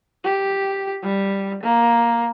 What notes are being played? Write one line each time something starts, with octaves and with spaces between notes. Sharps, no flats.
G4
G3
A#3